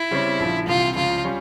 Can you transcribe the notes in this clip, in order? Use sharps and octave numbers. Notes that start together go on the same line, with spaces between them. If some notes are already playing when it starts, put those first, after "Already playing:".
Already playing: E4
C#3 G3 C4 G4 C#5
A#1 A#2 F3
C2 C3 E3 F4
C#2 C#3 F3 F4
G3 C#4